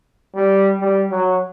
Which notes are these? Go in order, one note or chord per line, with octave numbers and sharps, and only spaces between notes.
G3
G3
F#3